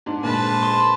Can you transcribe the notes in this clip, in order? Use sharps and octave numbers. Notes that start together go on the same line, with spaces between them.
G#2 D4
A#2 D3 G#3 B4 C5 A5
C6